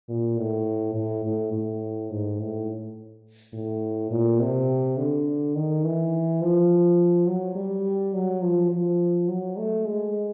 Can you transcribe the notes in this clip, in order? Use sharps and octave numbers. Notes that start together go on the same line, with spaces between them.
A#2
A2
A2
A2
A2
G#2
A2
A2
A#2
C3
D3
D#3
E3
F3
F#3
G3
F#3
F3
F3
F#3
A3
G#3